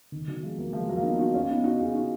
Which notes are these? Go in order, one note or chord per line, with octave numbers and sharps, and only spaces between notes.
D#3
D#3 F#3
F3 G#3
F#3 A#3
F3 G#3
F#3 A#3
F4
B3 D#4
D#4 F#4
C#4 F4
B3 D#4
D#4 F#4
F4 G#4
D#4 F#4